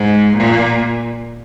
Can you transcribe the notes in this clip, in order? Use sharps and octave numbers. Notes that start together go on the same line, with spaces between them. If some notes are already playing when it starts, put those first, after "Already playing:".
Already playing: G#2
A#2